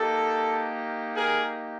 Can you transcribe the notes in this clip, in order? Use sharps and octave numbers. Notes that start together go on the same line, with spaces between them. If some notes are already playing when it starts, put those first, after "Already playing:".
Already playing: A#3 D#4 G4 A4
G#4 A#4